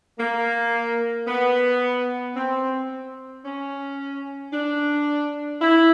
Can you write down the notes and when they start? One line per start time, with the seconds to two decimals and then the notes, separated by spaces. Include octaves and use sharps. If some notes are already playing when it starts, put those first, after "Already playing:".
0.19 A#3
1.27 B3
2.36 C4
3.44 C#4
4.53 D4
5.61 E4